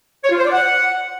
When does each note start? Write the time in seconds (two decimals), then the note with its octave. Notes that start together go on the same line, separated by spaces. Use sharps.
0.24 C#5
0.31 F4
0.38 C5
0.45 D5
0.52 F#5